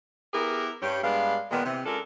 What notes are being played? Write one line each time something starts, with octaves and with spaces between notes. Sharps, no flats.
B3 E4 G4 G#4 A#4
G2 C#4 G4
G2 G#3 B3 D4 F5
A#2 D#3 G#3 A#3 B3
C3 E3
G#3 C#4 D4 F4 A4 A#4